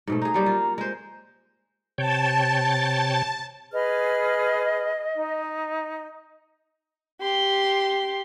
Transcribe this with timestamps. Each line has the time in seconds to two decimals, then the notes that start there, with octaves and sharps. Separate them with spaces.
0.07 G#2 B2 A3
0.22 D#4 G#4 A#5
0.34 F#3 G3 A#3
0.46 F4
0.78 G#3 C5
1.98 C3 C#5 G5 A5
3.73 G#4 B4 D#5 F6
5.17 D#4
7.21 G4 C6